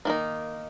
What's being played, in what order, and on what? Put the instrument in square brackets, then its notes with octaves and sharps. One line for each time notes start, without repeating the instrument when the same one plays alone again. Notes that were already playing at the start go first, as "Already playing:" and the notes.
[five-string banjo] D#3 A#3 D#4